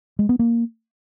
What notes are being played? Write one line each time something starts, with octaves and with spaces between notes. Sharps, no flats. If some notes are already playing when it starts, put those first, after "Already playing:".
G#3
B3
A#3